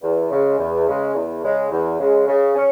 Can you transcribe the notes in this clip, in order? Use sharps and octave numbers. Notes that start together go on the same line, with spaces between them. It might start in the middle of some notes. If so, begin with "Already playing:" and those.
E2
C#3 G#3
E2
C#3 G#3
E2
C#3 G#3
E2
C#3 G#3
C#3
C#4